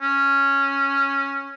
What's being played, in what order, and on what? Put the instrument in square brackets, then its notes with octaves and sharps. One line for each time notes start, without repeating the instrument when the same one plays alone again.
[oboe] C#4